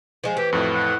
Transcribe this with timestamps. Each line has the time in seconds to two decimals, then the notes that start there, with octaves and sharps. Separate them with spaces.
0.24 F3 G#3
0.37 E3 G4
0.53 F2 A2 F#4
0.74 F#5